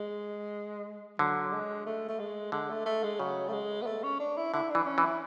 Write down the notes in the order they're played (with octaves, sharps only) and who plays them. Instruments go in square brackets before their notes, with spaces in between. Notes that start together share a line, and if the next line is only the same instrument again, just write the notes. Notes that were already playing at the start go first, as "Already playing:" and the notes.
Already playing: [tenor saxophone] G#3
[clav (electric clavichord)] D3 [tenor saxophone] F#3
[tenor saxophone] G#3
A3
A3
G#3
[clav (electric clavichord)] D3 [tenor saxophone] G#3
[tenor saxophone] A3
A3
G#3
[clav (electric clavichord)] C#3 [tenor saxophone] F#3
[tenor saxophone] A3
G#3
B3
A3
C#4
D4
E4
[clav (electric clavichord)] D3 [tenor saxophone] E4
[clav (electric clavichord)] E3 [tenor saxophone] D4
[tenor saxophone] C#4
[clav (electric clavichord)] E3
[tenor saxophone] E4